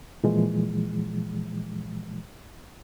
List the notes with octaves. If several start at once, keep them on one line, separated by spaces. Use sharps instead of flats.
A#2 E3 F3 G#3